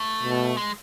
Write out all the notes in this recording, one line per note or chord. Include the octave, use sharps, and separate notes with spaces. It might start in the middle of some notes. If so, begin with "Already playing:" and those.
Already playing: A3
B2
G#3